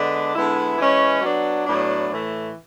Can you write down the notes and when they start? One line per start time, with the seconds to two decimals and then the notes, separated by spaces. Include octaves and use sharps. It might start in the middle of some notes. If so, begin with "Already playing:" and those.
Already playing: D3 G#3 B3 D4
0.34 D3 G#3 B3 E4
0.78 E3 G#3 C#4
1.22 F#3 B3 D4
1.66 A2 F#3 B3 D4
2.09 A2 E3 A3